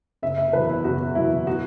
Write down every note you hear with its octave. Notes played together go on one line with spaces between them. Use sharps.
F#1 E5
E5
E2 B2 F#3 B4
E4
F#1 F#4
E2 B2 F#3 E4
F#4